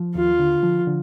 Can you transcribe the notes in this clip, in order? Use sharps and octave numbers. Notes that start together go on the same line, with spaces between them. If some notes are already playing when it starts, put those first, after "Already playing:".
Already playing: F3
D#2 F4
D3
F3
D3